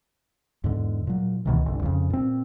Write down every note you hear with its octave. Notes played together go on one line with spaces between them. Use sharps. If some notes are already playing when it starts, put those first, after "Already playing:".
E2 G#2 D3
A#2 F#3
C#2 B2 D#3 E3
G1 C2 D3
F2 C#3
A#2 C4